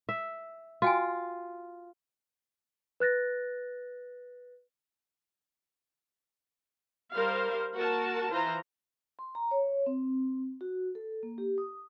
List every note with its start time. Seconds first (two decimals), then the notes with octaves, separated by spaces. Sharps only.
0.09 E5
0.82 F4 F#4 G5 G#5
3.00 B4 F#6 A6 A#6
7.13 G3 A#4 C5 F5
7.73 A#3 F#4 A#4 A5
8.30 E3 F4 C5 A#5
9.19 C6
9.35 A#5
9.51 C#5
9.86 C4
10.61 F#4
10.95 A4
11.23 A#3
11.38 G4
11.58 D#6